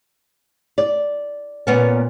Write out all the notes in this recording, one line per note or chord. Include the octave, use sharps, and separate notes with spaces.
D5
A#2 B3 C#4